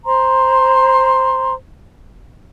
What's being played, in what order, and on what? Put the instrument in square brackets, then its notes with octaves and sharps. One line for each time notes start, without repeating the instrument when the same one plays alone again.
[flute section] C5 A#5 C6